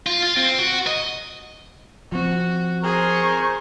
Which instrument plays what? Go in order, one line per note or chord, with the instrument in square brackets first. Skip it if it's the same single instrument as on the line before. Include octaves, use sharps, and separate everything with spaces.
[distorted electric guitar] F4
F4
C4
F#4
D#5
[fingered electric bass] F3 C4 [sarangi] F#4
[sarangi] G#4 [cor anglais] A#4 [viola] C5 C#6